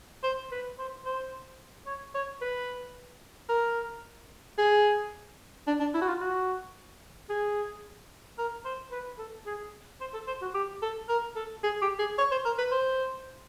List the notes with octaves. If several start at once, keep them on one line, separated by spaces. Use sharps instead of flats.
C5
B4
C5
C5
C#5
C#5
B4
A#4
G#4
D4
D4
E4
F#4
F4
F#4
G#4
A#4
C5
B4
A4
G#4
C5
A4
C5
F#4
G4
A4
A#4
A4
G#4
G4
G#4
C#5
C5
A#4
B4
C5